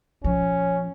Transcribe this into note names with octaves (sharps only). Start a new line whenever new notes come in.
A#2 F3 C#4